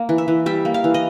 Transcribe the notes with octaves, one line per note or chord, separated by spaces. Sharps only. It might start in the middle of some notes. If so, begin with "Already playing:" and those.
Already playing: A#3
E3
E5
E3
G3 E5
A#3
F5
E3
D#5